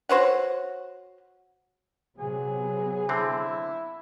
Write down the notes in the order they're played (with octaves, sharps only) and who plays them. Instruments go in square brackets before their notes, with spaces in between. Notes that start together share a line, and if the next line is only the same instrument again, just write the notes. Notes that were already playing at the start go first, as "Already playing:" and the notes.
[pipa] F#4 C5 C#5 F#5
[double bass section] C3 F#3 B3 [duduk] G#4
[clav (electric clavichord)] D3 C4 [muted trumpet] E4